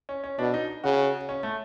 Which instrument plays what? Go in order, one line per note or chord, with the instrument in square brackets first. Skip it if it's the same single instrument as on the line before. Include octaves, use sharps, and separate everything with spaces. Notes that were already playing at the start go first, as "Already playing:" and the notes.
[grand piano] C#4
C#4
[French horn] B2 [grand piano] D4
[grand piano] D#4
[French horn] C#3 [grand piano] F#4
[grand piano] C#4
A3